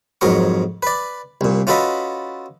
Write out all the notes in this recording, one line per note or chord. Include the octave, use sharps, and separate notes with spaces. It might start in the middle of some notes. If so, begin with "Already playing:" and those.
F2 G#2 F#3 A#4 C#6
B4 D5
C2 A#2
C#4 F4 F#4 A4 B4 D#5